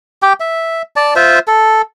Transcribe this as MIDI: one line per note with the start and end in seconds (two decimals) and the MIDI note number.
0.23 0.33 67
0.23 0.33 79
0.40 0.82 76
0.96 1.14 74
0.96 1.14 81
1.16 1.39 65
1.16 1.39 72
1.16 1.39 76
1.48 1.82 69